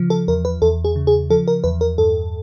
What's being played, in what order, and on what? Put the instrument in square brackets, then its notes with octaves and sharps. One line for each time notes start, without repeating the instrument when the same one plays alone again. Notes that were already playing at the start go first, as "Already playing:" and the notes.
Already playing: [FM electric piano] C#3 F3
A4
E2 A#4
B4
E2 A4
G#4
C#3
G#4
F3 A4
A#4
E2 B4
A#4
G2 A4